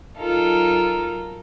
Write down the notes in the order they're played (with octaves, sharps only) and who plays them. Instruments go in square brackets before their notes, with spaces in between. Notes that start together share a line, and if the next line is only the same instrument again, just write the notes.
[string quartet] F#3 D#4 F4 A4 A#4